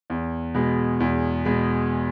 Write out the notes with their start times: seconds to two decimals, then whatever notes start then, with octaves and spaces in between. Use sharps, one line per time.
0.10 E2
0.54 B2 G#3
1.00 E2
1.45 B2 G#3